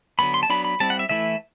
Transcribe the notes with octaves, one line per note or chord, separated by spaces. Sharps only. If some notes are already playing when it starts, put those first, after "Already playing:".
D3 F#3 B3 B5
C6
A5
F#3 B3 D4 B5
B5
G3 C4 E4 A5
F#5
E5
E3 A3 E4 E5